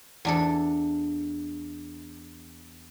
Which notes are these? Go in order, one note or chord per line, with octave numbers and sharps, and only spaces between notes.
E2 D4 A4